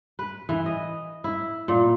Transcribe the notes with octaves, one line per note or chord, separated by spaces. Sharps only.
B4
E3
D#5
E4
A#2